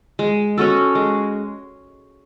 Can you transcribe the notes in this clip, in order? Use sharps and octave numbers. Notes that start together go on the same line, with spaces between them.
G#3
C#4 F#4 A4
G#3